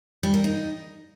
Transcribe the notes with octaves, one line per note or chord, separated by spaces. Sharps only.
G3
A#4
D#4